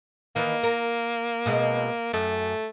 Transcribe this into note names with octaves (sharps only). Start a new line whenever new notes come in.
D#3 E3 A#3
A#4
B2 G#3 C4
F#2 A3